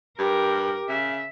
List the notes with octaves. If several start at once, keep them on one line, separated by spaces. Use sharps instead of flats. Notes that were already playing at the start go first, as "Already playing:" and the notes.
G2 G4 A#4
C#3 E5